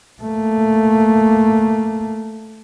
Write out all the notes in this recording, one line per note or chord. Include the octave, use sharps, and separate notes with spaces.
A3 A#3